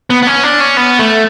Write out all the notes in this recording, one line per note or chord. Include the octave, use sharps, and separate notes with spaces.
B3
B3
C#4
D4
C#4
B3
A3